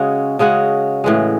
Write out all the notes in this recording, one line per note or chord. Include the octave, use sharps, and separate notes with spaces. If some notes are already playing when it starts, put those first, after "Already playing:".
Already playing: C#3 G#3 C#4 F#4
C#3 G#3 C#4 F#4
A2 E3 G#3